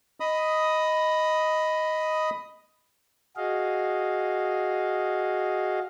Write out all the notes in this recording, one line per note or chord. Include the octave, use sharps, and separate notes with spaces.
D#5 B5 D#6
F#4 G#4 D#5 F5